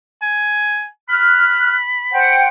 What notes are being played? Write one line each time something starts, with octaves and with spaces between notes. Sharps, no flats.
G#5
B5 F6 F#6
C5 F#5 G5